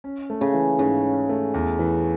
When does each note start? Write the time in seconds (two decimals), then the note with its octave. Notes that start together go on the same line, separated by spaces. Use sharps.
0.04 C#4
0.30 A3
0.41 C#3
0.54 E3
0.78 G#2 C#3
1.04 C#4
1.29 A3
1.54 E2
1.79 E3